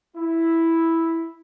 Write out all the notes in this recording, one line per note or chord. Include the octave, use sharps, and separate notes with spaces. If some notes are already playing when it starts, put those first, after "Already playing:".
E4